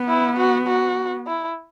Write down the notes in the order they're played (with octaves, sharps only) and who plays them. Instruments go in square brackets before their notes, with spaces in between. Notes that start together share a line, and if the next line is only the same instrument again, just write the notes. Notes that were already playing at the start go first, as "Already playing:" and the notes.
Already playing: [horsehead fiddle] B3
[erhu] E4
F#4
F#4
E4